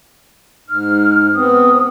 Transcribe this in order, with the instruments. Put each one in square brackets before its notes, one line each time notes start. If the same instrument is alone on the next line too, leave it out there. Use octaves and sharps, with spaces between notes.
[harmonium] G#2 [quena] F6
[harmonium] B3 C4 [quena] D#6